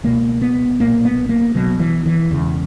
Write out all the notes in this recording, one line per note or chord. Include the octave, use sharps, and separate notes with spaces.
C#2 B2 A#3
B3
B1 A#2 A#3
B3
A#3
B1 B2 F#3
E3
E3
E1 E2 C#3